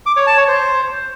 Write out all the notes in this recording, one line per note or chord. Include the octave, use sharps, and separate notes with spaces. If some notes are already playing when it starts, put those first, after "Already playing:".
D6
C#5
A5
C#5
C5